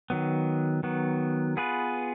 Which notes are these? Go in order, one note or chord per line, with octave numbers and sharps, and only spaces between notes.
D#3 F#3 B3
D#3 F#3 B3
B3 F4 G#4 B4